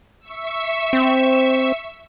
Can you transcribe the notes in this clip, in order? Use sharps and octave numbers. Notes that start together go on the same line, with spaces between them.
E5 C#6 E6
C4